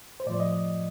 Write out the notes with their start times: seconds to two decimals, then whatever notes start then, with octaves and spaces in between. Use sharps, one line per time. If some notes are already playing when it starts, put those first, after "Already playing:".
0.20 C5
0.27 A2 F3 D5
0.40 D#5